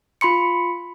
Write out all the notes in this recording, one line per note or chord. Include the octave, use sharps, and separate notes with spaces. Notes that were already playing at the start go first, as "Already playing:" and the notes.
F4 B5 C6 C#7